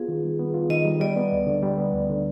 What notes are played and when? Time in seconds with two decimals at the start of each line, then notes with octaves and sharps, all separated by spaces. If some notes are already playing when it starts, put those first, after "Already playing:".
Already playing: B3 F4 G#4
0.08 D#3
0.24 G3
0.39 B3
0.54 F4
0.70 D#3 D#5
0.85 G3
1.00 G3 D5
1.16 B3
1.32 D2
1.47 D3
1.63 G3
1.78 B3
1.94 D2
2.10 D3